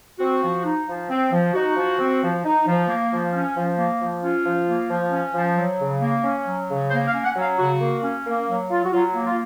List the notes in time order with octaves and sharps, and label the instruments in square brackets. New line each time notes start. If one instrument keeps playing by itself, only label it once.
[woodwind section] C4 F#4
F3
D#4
F3
C4
F3
D#4 F#4
F3
C4
F3
D#4
F3
A#3
F3
C#4
F3
A#3
F3
C#4 F4
F3
A#3
F3
C#4
F3
F#3
C#3
A#3
C#4
F#3
C#3
A#3 C5
F5
C#4
F#5
F#3
F5
C#3 F#4
A#3
C#4
A#3
F#3
F4
F#4
F#3 F4
A#3
F4